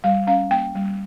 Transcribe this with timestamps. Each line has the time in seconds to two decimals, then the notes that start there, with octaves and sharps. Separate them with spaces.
0.04 G3 F5
0.27 C#4 F5
0.51 A#3 G5
0.75 G3